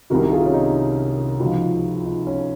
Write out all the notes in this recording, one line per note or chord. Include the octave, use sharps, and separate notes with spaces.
C2 C3 D#3 F#4 A#4
F4 G#4
C#4
D#4
C#2 C#3 F3 D#4 F#4
F4
D#4
C#4